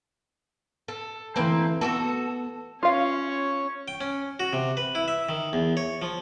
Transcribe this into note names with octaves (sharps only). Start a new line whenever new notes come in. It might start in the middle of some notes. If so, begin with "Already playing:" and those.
A4
E3 A3 A#3 C4 B4
B3 F#4 G4 A4
C#4 F4 C#5 F5
G5
C#4
F#4
C3
B4
E4
E5
D#3
E2
C#5
F3